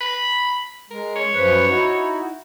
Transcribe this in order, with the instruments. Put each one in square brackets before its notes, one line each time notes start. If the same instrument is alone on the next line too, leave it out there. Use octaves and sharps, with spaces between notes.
[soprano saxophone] B5
[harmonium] G#3 [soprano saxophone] A#4
[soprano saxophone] C#5
[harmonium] F#2 F3 B4
D#4 E4 F#4